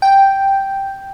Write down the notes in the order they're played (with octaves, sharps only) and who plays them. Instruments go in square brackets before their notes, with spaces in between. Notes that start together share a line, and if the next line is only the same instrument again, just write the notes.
[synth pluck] G5